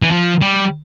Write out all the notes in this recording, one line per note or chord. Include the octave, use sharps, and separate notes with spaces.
E3
F3
G3